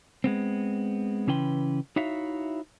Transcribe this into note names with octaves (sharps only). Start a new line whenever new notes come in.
G#3 B3 C4
C#3 E3 C#4 B4 G5 C6
D#4 E4 F#4 C#5 E5 F5